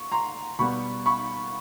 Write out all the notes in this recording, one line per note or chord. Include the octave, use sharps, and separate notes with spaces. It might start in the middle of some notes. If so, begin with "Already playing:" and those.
Already playing: C#6
A#5 C6
B2 G3 B3 B5 C#6
B5 C#6